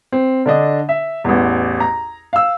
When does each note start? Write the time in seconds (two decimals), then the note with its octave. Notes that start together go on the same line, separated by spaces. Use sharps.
0.12 C4
0.46 D3 D4 D#5
0.89 E5
1.24 A1 E2
1.80 A#5
2.33 F5 E6